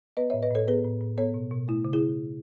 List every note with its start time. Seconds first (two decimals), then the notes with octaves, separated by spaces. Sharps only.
0.17 B3 B4 D#5
0.30 C#5 E5
0.33 A2
0.43 B4 D#5
0.51 A2 A4 C#5
0.67 B3 G#4 B4
0.84 A2
1.01 A2
1.18 B3 A4 C#5
1.34 B2
1.51 B2
1.68 A3 E4
1.85 C#3
1.93 E4 G#4